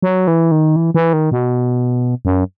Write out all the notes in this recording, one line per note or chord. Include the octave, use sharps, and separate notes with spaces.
F#3
E3
D#3
E3
E3
D#3
B2
F#2